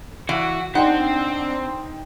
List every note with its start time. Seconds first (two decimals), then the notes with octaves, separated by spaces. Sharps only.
0.29 E3 F#4 F5
0.75 C4 D4 D#4 C5 F#5 G5